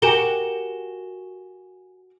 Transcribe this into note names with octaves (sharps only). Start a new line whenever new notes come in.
F#4 G4 A#4 G#5 E7 G7